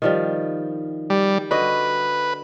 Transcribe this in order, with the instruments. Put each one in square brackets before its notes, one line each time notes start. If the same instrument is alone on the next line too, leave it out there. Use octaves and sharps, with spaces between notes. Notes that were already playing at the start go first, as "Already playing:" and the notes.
[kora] D#3 F3 G3
[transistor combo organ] G3
[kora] D3 F#4 D#5 [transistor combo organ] B4